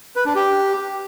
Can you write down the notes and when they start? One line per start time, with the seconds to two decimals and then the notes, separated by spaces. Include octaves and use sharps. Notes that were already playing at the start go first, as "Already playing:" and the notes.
0.16 B4
0.26 D4
0.35 G4